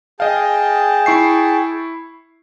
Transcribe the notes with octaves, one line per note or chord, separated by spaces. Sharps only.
G#4 D#5 F5 G5 A5
E4 C#6 C7